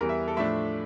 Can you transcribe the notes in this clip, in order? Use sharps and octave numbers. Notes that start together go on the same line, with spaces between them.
E2 E3 G3 A#4
E5
A4
A2 F3 A3 D4 E5